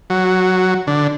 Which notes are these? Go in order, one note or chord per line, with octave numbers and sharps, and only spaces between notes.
F#3
D3